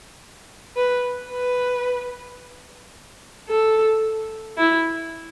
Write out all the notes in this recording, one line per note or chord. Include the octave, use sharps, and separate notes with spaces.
B4
B4
A4
E4